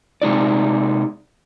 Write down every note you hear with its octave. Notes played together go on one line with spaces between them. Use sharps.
C3 G#3 D#4 D5